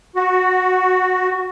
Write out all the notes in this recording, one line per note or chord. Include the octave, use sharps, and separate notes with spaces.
F#4